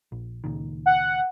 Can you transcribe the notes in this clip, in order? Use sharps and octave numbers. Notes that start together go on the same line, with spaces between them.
A#1
C#2 A#2 D#3
F#5